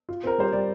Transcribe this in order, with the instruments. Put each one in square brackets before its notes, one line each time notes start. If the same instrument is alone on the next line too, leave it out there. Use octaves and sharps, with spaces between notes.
[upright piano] F4
[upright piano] C4 [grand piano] A#4
[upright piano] G3 [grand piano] C5
[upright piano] G3 [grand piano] D5